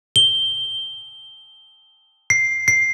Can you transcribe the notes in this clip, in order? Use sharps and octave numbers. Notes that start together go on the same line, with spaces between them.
G7
C7
C7